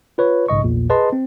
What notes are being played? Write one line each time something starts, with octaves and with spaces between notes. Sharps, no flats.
F4 B4 C#5
B1 G#2 C#3 D#5 C#6
A#1 E2 A#2
G#4 B4 D#5 A5 C6
C4